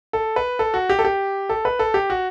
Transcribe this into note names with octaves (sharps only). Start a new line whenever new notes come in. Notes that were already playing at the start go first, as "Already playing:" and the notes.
A4
B4
A4
F#4
G4
A4
G4
A4
B4
A4
G4
F#4